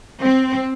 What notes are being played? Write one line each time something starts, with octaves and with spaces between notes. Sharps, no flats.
C4